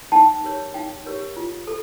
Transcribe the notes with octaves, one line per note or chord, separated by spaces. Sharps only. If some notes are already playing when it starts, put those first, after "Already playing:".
D#4 G5 A5
G4 A#4 C#5
D#4 F5 G5
G4 A#4 C#5
F4
A4